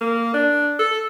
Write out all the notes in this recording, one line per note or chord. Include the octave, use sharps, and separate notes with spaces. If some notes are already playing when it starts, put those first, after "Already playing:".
A#3
D4
A4